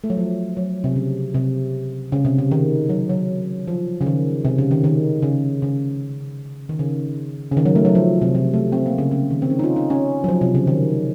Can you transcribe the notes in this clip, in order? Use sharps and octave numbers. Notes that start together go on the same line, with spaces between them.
A3
F#3
F3
F#3
C3
C#3
C3
C#3
C3
C#3
D#3
F#3
F#3
F3
C#3
D#3
C3
C#3
D#3
D#3
C#3
C#3
D#3
C#3
C#3
D#3
F#3
A3
F#3
F3
C3
C3
A3
C4
A#3
C#3
C#3
D#3
C4
C#4
D#4
F4
D#4
C#4
F#3
F3
C3
C#3
D#3